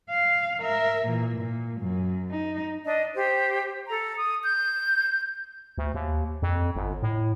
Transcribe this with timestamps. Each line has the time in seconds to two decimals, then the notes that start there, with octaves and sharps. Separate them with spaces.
0.10 F5
0.61 A#4 E5
1.05 A#2 E3
1.39 A#2
1.81 F#2
2.30 D#4
2.85 D4 D#5
3.14 G4 C5
3.88 A4 A#5
4.17 D#6
4.43 G6
5.78 D2
5.94 D#2
6.42 F2
6.76 G1
7.02 A2